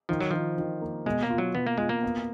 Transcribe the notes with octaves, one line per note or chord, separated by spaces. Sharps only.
D#3 F3
F#3
D#3 F3
D#3
A#3
B2 G#3
A#3
F4
F#3
B2 B3
A#3
G#3 F4
A#3
B3